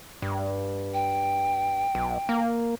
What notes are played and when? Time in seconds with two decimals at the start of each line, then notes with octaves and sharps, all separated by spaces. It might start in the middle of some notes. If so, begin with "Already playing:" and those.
0.22 G2
0.94 G5
1.95 B1
2.29 A#3